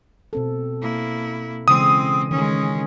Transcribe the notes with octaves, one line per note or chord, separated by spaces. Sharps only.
B2 C4 A4
A#3 E4
C#3 E3 G#3 C4 D#6
D#3 G#3 C#4